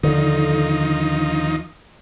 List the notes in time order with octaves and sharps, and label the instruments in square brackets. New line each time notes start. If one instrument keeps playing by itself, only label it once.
[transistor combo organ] D#2 F3 D#4 [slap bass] D3